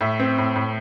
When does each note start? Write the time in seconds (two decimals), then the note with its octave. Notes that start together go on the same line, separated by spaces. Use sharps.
0.01 A2 E5
0.19 C4
0.38 A2
0.56 A2